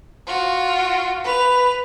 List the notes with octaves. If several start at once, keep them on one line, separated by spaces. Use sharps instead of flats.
F4 F#4
B4 F7